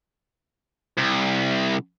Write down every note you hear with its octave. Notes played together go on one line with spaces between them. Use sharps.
C2